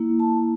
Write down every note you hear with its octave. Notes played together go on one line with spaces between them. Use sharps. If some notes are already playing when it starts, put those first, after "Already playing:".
Already playing: A#3 E4
A5